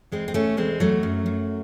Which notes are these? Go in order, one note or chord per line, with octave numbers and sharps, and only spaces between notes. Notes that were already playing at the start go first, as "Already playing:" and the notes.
E2 G#3 C4
C4
C3 A3 C#4
E2 G#3 C4
E2 F#3 A3
F#2
F#2